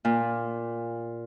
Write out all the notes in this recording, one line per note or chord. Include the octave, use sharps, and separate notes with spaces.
A#2